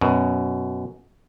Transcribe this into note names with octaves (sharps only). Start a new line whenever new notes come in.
F#2 B2